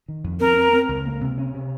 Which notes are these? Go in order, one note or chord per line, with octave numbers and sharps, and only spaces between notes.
D#3
F2
C4 A#4
C4
C4
C#2
A#3
C3
C#4
C3